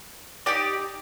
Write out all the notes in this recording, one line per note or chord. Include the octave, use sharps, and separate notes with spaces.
D#4 G4 D5